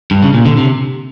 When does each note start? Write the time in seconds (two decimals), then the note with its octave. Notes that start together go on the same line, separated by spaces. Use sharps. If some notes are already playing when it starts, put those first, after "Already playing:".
0.11 G2
0.22 C#3
0.34 A#2
0.45 D3
0.57 C3